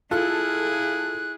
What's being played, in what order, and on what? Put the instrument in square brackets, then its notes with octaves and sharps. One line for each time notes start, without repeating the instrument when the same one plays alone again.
[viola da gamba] E4 G#4 [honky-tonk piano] F4 A4 [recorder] F#6